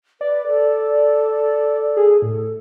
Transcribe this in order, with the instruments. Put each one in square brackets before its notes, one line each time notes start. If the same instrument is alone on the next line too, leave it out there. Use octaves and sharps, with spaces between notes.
[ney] B4 [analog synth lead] D5
[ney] A4
[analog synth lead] G#4
[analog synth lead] A2 [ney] A4